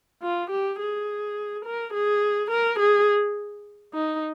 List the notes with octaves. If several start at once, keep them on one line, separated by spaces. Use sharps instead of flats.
F4
G4
G#4
A#4
G#4
A#4
G#4
D#4